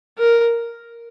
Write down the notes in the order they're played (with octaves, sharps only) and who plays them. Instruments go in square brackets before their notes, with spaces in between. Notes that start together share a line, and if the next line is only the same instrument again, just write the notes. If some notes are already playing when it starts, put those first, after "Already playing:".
[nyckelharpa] A#4